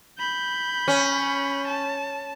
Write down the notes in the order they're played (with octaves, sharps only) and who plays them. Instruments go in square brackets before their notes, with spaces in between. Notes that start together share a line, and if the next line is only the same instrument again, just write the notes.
[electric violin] B5 G6
[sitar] C#4
[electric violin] A5